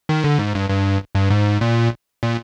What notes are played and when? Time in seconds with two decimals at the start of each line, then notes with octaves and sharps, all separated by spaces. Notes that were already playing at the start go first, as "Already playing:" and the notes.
0.09 D#3
0.24 D3
0.39 G#2
0.55 G2
0.70 G2
1.15 G2
1.30 G#2
1.61 A#2
2.23 A#2